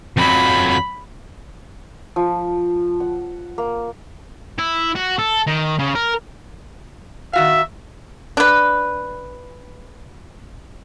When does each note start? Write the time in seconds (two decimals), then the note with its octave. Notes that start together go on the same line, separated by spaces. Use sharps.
0.17 F2 F#3 B5
2.16 F3
3.00 F#5
3.58 A#3
4.58 E4
4.95 F#4
5.19 A4
5.47 D#3
5.79 C#3
5.95 A#4
7.33 D#3 F#4 E5 F5
8.37 D4 B4